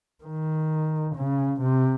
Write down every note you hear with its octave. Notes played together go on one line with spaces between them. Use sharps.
D#3
C#3
C3